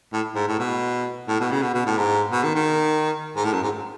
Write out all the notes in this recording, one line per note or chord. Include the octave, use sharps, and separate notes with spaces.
A2
G#2
A2
B2
A2
B2
C#3
B2
B2
A2
G#2
B2
D#3
D#3
G#2
A2
F#2
G#2